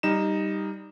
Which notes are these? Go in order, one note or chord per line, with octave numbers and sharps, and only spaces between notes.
G3 D#4 E7